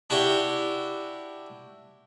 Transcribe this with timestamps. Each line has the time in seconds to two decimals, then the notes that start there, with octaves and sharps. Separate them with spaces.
0.10 D4 E4 F#4 G4